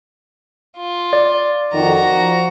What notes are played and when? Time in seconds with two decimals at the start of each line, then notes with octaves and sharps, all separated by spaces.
0.77 F4
1.13 D5
1.73 F2 D#3 F#4 A#5
2.10 F3